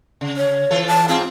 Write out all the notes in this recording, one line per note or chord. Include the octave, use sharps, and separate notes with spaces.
C#3
C#5
E3 F4 A4
A5
G#2 C4 F4 G#4